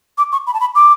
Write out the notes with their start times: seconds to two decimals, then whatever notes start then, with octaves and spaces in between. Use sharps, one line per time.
0.18 D6
0.32 C#6
0.47 B5
0.54 A5
0.60 B5
0.75 D6